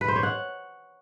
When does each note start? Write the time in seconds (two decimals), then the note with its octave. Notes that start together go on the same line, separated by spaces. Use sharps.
0.01 B4
0.08 C5
0.16 C#5
0.23 F#5